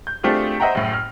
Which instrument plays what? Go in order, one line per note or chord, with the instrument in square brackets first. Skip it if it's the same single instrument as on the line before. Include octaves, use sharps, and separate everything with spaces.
[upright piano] G6
A3 C4 D4 F4 G4 G#4
C5 D#5 E5 F#5 G5 A#5
F#1 A2
F6